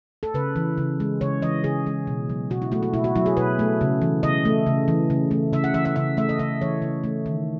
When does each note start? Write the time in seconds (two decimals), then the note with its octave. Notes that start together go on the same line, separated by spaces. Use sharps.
0.23 A4
0.34 C#3 B4
0.56 E3
0.78 C#3
1.00 G#3
1.21 C#3 C#5
1.42 E3 D#5
1.64 C#3 G#4
1.86 G#3
2.07 B2
2.30 F#3
2.50 B2 F#4
2.62 E4
2.72 A3 F#4
2.83 F#4
2.94 B2 E4
3.04 F#4
3.15 F#3 E4
3.26 G#4
3.37 B2 B4
3.59 A3
3.81 C#3
4.02 E3
4.23 C#3 D#5
4.45 A3
4.67 C#3
4.88 E3
5.10 C#3
5.31 A3
5.53 C#3 E5
5.64 F#5
5.74 E3 E5
5.85 E5
5.96 C#3 E5
6.17 A3 E5
6.29 D#5
6.39 C#3 E5
6.61 E3 C#5
6.82 C#3
7.04 A3
7.26 D#3